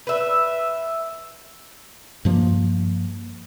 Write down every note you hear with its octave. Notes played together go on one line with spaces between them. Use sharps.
B4 E5
G2 F3 A#3